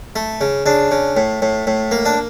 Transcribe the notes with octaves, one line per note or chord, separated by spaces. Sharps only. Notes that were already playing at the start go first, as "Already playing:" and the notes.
A3
C#3
C#3 D4
C#3
A2
A2
A2
A#3
D4